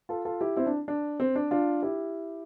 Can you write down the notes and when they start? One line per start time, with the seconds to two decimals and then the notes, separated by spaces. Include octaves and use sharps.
0.09 F4 A4
0.25 F4 A4
0.41 E4 G4
0.57 C4 E4
0.67 D4
0.88 D4
1.20 C4
1.36 D4
1.51 D4 F4
1.82 E4 G4